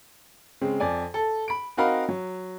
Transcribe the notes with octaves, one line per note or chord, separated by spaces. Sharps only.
C#3 G#3 C4
F2 D5 G#5
A4
B5 D7
C4 D#4 F#4 A#4 F5 B5
F#3